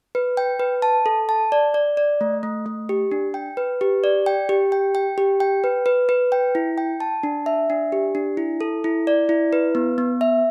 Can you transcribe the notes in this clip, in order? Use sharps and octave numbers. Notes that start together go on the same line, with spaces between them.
B4
G5
B4
A5
A4
A5
D5
D5
D5
A3
A3
A3
G4
D4
G5
B4
G4
D5
G5
G4
G5
G5
G4
G5
B4
B4
B4
G5
E4
G5
A5
D4
E5
D4
G4
D4
E4
A4
E4
D5
E4
B4
B3
B3
E5